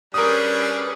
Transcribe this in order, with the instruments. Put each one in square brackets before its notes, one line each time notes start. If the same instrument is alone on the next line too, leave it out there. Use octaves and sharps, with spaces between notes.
[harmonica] G3 D4 [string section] C#4 G#4 B4 [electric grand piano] A#4 D#6